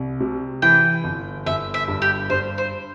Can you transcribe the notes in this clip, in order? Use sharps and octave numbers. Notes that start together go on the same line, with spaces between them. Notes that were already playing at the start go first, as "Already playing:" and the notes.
Already playing: C2
C3
E3 G5
G1
G1 E5
E5
G2
G4
G2 C5
C5